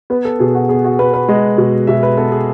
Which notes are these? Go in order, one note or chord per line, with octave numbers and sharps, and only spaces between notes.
B3 B4
A4
B2 G#4
F#4
B3 G#4
F#4
B3 B4
B4
G#3 D#5
B2
B2 E5
B4
B3 A4
G#4